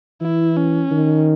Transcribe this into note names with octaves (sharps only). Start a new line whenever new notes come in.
E3 E4
C#4
D#3